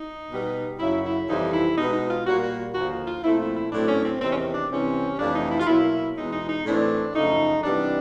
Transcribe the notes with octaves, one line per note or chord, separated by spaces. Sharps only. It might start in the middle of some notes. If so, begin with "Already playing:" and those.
Already playing: D#4
B2 G3 B3
F#2 C#3 F#3 E4
E4
F2 C3 E3 G3 C4 D#4
E4
B2 G#3 B3 D#4
D#4
F4
A#2 G3 A#3 F#4
F#4
D#2 D3 F3 F#4
F4
A#2 F3 A3 C4 E4
E4
E4
A2 F#3 A3 C4 D4
C#4
C4
E2 C3 D#3 C4
C#4
C4
D4
C3 E3 G3 C4 C#4
F2 C3 E3 A3 D4
D#4
E4
F4
B2 F#3 A#3 E4
E2 B2 G#3 D#4
D#4
D#4
A2 E3 A3 C4 D4
F#2 C#3 F3 A3 D#4
C3 E3 G3 B3 D4